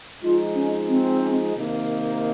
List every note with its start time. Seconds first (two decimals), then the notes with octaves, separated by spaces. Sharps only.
0.22 F3 G#3 D#4 F4
0.55 C#4
0.88 C4
1.54 C3 D#3 A#3 D#4